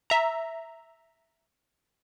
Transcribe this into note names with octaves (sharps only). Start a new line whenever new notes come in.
E5 A#5